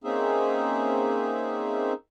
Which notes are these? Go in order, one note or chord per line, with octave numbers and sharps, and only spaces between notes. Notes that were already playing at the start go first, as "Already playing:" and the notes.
A#3 C4 C#4 D#4 G#4 E5